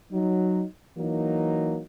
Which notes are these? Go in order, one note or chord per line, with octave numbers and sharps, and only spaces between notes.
F#3 D#4
E3 F#3 A#3 D#4